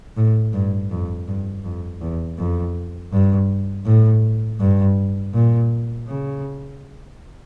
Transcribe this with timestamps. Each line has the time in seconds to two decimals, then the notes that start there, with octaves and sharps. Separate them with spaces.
0.17 A2
0.53 G2
0.91 F2
1.28 G2
1.64 F2
2.01 E2
2.38 F2
3.12 G2
3.86 A2
4.60 G2
5.33 A#2
6.07 C#3